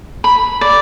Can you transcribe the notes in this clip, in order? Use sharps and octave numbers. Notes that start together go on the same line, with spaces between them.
B5
D5